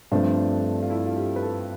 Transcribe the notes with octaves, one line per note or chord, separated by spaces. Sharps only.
G2 F3 A3 C4 D4
F4
E4
F4
G4
B4
A4